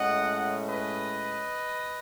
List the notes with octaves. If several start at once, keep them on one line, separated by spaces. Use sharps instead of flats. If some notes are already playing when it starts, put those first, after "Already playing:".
Already playing: A2 G#3 C#4 D#5 F#5
B4 D#5